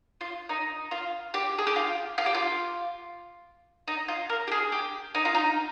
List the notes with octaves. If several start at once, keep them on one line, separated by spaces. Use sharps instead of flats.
F4
D#4
F4
G4
G#4
G4
F4
F4
G4
F4
D#4
F4
A#4
G4
G#4
G4
D#4
F4
D#4